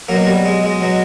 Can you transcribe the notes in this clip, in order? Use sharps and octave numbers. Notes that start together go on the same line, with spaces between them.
B2 F#3 A#3
G3
G#3
G#3
B2 F#3